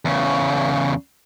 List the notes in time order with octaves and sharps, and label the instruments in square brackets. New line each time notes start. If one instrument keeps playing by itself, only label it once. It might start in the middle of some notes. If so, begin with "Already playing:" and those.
[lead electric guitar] E2 C#3